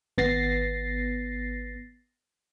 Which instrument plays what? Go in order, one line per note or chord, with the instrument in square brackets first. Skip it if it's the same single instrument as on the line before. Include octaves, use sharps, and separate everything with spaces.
[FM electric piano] G#1 B3 A6 A#6 C7